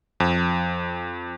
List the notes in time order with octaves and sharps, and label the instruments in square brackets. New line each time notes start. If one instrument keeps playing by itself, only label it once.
[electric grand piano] F2